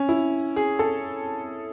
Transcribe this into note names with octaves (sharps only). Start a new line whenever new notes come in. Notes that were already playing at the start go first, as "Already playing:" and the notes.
Already playing: C#4
E4
G#4
A4